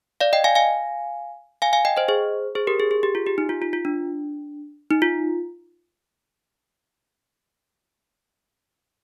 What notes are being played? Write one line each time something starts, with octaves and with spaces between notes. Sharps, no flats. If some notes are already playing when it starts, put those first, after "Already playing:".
D5 F5
D#5 G5
F5 G#5
F5 G#5
F5 G#5
F5 G#5
D#5 G5
C5 D#5
G#4 C5
G#4 C5
G4 A#4
G#4
G#4
G4
F4
G4
D#4
F4
F4
F4
D4
D#4
F4